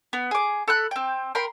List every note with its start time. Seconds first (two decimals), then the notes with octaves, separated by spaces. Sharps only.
0.13 B3
0.31 G#4 D6
0.68 A4 B5 F#6
0.91 C4 G5
1.35 A#4 G5 B5 C6